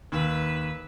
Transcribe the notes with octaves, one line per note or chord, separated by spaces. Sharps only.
D#2 B4 E6